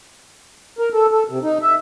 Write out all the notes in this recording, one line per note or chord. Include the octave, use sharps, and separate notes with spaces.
A#4
A4
A4
C3
D#4
E5